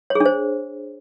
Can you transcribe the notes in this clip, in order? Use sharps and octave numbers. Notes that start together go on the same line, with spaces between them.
C#5
G#4
D4
C5